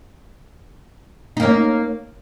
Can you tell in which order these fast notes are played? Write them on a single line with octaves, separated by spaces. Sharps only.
D#4 A#3 C#4